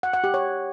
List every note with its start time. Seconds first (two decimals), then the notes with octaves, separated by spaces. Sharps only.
0.03 F#5
0.13 F#5
0.24 G4
0.34 C#5